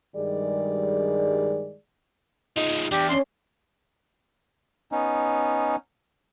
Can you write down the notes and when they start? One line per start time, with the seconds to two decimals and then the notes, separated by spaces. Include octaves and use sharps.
0.16 G2 D#3 G3 G#3 G#4 D5
2.57 F3 G#3 D#4
2.92 E2 D4 G4
3.09 C#4 C6
4.92 B3 C#4 D#4